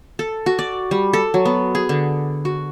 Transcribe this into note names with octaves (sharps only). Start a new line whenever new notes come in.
A4
F#4
D5
G3
A4
F#3
B3
G#4
D3
F#4